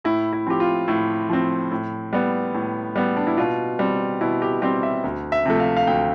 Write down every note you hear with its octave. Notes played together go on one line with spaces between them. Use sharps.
A2 E4
E4
F3 C4 G4
F4
A2 E4
F3 C4
A2
G3 B3
A2
G3 B3
D4
E4
B2 F4
G3 C4
B2 E4
G4
G3 C4 G4
E5
D2
E5
C3 F3 A3
F5
F5
D2 G5